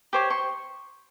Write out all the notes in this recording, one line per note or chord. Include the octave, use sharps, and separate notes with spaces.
G4 C5 C#5
C6 C#6